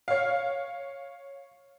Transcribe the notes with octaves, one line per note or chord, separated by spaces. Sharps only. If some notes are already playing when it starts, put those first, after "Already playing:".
C#5 F5